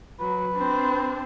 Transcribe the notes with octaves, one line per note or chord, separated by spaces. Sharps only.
F#3 B4
C4 D4